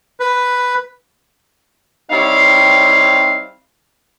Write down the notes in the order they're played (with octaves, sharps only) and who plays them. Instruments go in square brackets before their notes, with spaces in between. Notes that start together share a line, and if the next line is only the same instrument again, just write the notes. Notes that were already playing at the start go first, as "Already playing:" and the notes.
[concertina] B4
[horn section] G3 C4 D#4 E4 C#5 F5